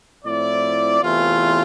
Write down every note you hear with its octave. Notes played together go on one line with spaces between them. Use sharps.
A2 F3 C4 E4 D5
E2 C3 E3 A3 F4